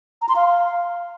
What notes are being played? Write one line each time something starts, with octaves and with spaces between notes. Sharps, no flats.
A#5
C6
F5